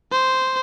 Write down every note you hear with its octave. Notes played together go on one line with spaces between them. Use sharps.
C5